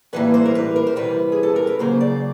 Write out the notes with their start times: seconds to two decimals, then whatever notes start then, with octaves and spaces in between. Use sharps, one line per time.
0.13 A2 E3 G3 A#3 B4
0.34 C5
0.45 A#4
0.55 B4
0.76 A#4
0.87 C5
0.96 C3 E3 G3 B4
1.32 G#4
1.43 A4
1.56 A#4
1.67 B4
1.79 C#3 F#3 A#3 C5
2.01 D5